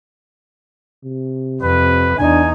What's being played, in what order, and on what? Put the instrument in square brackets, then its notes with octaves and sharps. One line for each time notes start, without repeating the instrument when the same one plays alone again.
[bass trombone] C3
[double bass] F2 [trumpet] B4
[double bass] E2 D#4 [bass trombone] D4 [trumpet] G#5